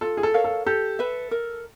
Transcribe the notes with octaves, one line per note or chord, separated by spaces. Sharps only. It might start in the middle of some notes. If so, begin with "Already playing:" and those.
F4 A4
G#4
A4
A#4 C#5 F5
A4
G4 A4
B4 E5
A#4